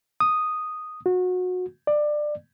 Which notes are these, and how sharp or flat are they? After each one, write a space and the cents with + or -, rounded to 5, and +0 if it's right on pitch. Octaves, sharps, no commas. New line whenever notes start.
D#6 -5
F#4 -25
D5 +20